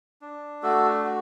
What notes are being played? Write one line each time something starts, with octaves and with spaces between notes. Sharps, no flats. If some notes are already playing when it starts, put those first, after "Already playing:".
D4
A3 F#4 A4
F#4